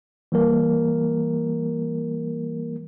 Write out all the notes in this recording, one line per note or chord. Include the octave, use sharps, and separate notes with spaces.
E3 G3 A#3 A#4